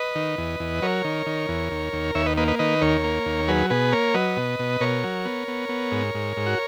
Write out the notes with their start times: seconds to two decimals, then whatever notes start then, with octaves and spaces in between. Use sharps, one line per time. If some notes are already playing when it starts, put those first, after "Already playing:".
Already playing: B4 D#5
0.15 D#3
0.38 E2
0.60 E2
0.82 F#3 A#4 C#5
1.04 D#3
1.26 D#3
1.49 E2
1.71 D#2
1.93 D#2
2.15 D#2 C#5 E5
2.26 B4 D#5
2.37 A#3 B4 D#5
2.48 B4 D#5
2.59 D#3 B4 D#5
2.82 D#2 A#4 C#5
3.04 A#3
3.26 D#2
3.48 F#3 G#4 B4
3.70 B2 G#4 B4
3.92 A#3 A#4 C#5
4.14 F#3 B4 D#5
4.37 B2
4.59 B2
4.81 B2 A#4 C#5
5.04 F#3
5.25 B3
5.48 B3
5.69 B3
5.92 G#2
6.15 G#2
6.37 G#2
6.47 F#4